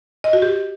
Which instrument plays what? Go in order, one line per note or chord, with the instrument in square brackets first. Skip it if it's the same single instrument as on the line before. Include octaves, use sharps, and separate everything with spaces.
[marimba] D#5
F#4
G4